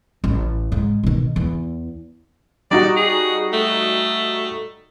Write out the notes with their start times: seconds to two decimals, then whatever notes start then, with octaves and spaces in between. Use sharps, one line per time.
0.24 A1
0.72 G#2
1.03 B2 D#3
1.36 E2
2.71 G3 D#4 F#4 D5
2.96 G#4
3.53 A3